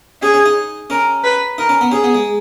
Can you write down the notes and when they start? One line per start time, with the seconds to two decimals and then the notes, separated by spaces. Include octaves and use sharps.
0.22 C#4 G#4
0.34 C#4
0.46 D#4
0.90 C#4 A#4
1.24 B4
1.58 D#4 A#4
1.69 C#4
1.81 B3
1.91 C#4 G#4
2.04 B3
2.15 G#3